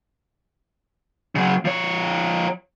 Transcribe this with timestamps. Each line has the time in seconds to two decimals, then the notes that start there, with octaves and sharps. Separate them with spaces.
1.35 C#3 F#3
1.65 F3 C#5